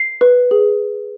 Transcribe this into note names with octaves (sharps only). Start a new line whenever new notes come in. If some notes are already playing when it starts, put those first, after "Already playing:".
Already playing: C7
B4
G#4